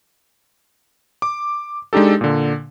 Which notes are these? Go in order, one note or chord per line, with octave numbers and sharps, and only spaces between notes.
D6
G#3 D4 D#4 G4 A4
A#2 D3